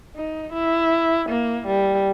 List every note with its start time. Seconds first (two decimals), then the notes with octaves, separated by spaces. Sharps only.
0.16 D#4
0.53 E4
1.29 A#3
1.66 G3